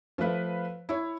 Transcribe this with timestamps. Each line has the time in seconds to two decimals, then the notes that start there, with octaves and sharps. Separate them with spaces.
0.18 F3 A3 B4 F5
0.89 E4 C#5